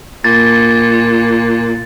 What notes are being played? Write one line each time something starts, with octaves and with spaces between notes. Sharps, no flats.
A#2 A6